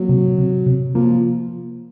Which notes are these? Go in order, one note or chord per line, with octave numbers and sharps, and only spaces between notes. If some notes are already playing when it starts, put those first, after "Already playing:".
Already playing: F#3 A#3
C3
C3
C3
F3 A#3